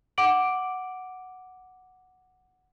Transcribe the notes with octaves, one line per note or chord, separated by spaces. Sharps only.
F#5 D6 D7 F#7